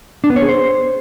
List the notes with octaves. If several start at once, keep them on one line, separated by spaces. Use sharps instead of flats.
D4
B3
C#5
G#4
C5